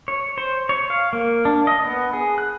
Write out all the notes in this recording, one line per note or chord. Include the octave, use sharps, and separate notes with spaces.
C#5
C5
C#5
F5
A#3
D4
D#5
B3
G#4
F#6